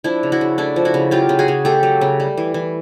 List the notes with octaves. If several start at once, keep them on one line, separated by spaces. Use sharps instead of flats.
F3 D4 E4
C#3
E4 F#4
C#3
A3 D4 E4
F3
E4 F#4
C#3
F#3 F4 G4
C#3
F#4 G#4
C#3
A3 G4 A4
F#3
C#3
G3
E3
E3